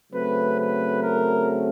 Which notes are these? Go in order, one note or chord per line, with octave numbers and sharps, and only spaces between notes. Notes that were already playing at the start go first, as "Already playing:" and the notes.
C#3 F#3 A3 C4 B4
B4
A#4